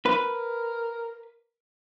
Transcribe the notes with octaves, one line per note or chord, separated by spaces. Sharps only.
A#4 B4